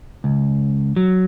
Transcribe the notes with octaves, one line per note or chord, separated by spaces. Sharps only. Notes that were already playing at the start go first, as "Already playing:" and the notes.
C#2
F#3